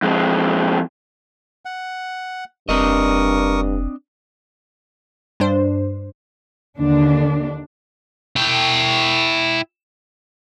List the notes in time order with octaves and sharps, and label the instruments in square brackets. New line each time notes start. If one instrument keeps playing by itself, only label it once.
[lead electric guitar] F2 G#3
[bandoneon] F#5
[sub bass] F1 [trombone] G2 [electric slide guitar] C4 D4 D#5 [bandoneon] A#4 C#6 D#6
[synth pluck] G2 D4 C5
[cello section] D#2 D3 D4
[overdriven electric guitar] E4 G5